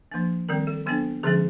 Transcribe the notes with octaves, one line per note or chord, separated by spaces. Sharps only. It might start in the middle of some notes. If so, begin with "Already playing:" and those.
F3 A#3 D4
D#3 G3 C4 A#4
A4
F#3 B3 D4 A4
D3 F3 G#3 C#4 G#4